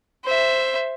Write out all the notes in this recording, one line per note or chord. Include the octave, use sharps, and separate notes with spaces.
C5 E5